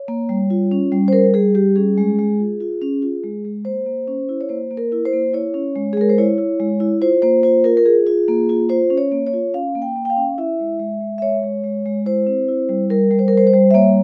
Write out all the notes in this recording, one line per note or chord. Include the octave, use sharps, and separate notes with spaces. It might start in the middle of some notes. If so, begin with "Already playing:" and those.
Already playing: C#5
A#3
G3
F4
C#4
G3
C5
G3 A#4
G3 G#4
G3 G4
C#4 G#4
G#3
G#3
F4
F4
C#4
F4
G#3
G#3
A#3 C5
A#3
C#4
E4
C#5
A#3 C5
A#3
A#4
E4
C5
A#3
E4 C#5
C#4
G#3
G#4
G#3 A#4
C5
E4 C#5
E4
G#3
E4
F4 C5
A#3 C5
F4 C5
F4 A#4
A#4
F4 G#4
F4
A#3
F4
F4 C5
C#4
C#5
A#3
C#5
F4
C#4 F5
A#3
G5
A#3
G5
F5
C#4
E4 E5
G#3
G#3
G#3
E5
G#3 C#5
G#3
G#3
G#3
E4 C5
C4
E4
G3
G3 A#4
G3
C5
A#4
G3 C5
C5
G3
E5
A#3 C#5